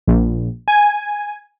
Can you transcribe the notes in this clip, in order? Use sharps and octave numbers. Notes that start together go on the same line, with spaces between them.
A#1
G#5